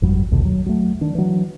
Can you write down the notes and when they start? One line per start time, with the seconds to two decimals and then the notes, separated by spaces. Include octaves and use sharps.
0.02 G1 F2 F#3 G3
0.31 A#1 D#2 B2 D3
0.45 F#3
0.66 F#3 A3
1.01 D#3 D4
1.15 E3 F#3